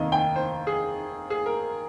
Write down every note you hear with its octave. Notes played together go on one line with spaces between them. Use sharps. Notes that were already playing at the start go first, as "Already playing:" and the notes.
Already playing: F1 D#2 D#3 D#5
G5
C5
G#4
G#4
A#4